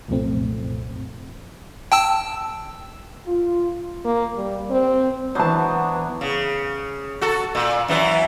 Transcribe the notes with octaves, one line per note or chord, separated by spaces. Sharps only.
C2 F#2 A#2 F3 A3 C4
G5 A5 E6
F4
A#3
G3
C4
E3 F#3 B3 D4 C5 A5
C#3
F#4 A4
A#2
F#2 E3 B3